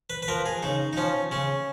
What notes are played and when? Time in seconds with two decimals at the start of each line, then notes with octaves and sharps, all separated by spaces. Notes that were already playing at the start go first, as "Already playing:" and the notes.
0.10 B4
0.22 B4
0.28 F3 A#4
0.46 G#4
0.62 C#3 D#4
0.93 D#4
0.97 F3 C#4
1.31 C#3 C#4